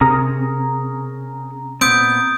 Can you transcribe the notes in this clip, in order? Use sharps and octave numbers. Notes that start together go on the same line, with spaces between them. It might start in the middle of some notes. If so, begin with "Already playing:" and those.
C3 C#4 G#4 A#4 A#5
A#2 B3 C4 D#6 G6 D7